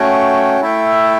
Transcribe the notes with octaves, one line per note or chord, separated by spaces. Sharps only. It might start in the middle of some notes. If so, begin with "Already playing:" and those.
Already playing: A3 C#4 F#4 C#5 G5
A3 E4 A4 E5 G5